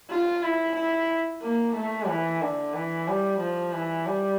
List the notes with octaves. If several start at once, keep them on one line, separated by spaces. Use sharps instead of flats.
F4
E4
E4
A#3
A3
E3
D3
E3
G3
F3
E3
G3